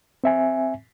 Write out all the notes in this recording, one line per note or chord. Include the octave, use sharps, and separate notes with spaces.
C4 E5 G#5